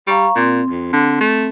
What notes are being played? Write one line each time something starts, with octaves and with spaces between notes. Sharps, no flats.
G3 F5 A#5 C#6
A#2 C4
F2
D3
A3